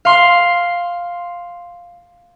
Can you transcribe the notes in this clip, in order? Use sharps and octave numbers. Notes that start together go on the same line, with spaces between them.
F5 C6